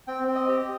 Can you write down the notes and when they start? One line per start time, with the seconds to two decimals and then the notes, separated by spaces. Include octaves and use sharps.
0.07 C4 G5
0.28 C4
0.35 D#5
0.48 G4